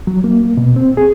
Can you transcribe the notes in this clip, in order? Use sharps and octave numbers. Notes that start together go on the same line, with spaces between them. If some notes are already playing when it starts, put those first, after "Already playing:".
F#3
A#3
B2
C4
G#4